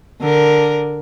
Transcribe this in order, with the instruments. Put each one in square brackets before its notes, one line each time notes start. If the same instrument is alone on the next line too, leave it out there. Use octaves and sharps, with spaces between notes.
[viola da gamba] D3 A#4